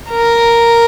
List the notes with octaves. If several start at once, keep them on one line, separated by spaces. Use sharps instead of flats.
A#4